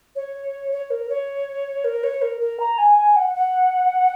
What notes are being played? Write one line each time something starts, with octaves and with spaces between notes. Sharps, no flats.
C#5
C#5
A#4
C#5
A#4
C#5
A#4
A#4
A#5
G#5
G#5
F#5
F#5